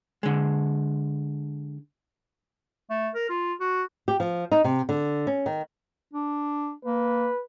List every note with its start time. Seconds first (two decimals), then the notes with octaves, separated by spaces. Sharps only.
0.23 D3 G#3
2.90 A3
3.15 A#4
3.29 F4
3.60 F#4
4.08 G4
4.20 F3
4.52 D#4
4.64 C3
4.89 D3
5.27 C#4
5.46 D#3
6.14 D4
6.85 A#3 B4